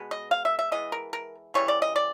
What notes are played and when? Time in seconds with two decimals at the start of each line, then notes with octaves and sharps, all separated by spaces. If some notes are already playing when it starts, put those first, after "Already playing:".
Already playing: B2 G#3 B3
0.11 D#5
0.31 F5
0.45 E5
0.59 E5
0.72 E3 G#3 B3 D#5
0.92 A#4
1.13 A#4
1.54 C#3 E3 G3 C#5
1.68 D5
1.82 D#5
1.96 D5